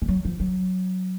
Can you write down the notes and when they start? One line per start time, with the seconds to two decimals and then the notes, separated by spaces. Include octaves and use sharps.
0.02 G#3
0.08 F#3
0.25 F3
0.40 F#3